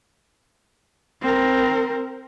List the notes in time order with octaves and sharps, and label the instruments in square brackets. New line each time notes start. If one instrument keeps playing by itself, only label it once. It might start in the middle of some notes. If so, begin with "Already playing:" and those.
[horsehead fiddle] C4 A#4